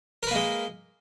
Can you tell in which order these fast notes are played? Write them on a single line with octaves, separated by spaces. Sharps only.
A#4 B4 A#3 G#3